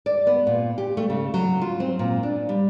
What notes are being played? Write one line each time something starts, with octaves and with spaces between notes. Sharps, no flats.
D5
B3
A#2
G4
A3
C#3
F#3
F4
C4
A#2
D4
G3